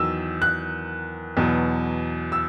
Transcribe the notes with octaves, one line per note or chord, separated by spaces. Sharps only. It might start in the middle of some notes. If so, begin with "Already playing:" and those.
Already playing: E2 D#3 F#3 E6
F#6
E2 B2 F#3
E6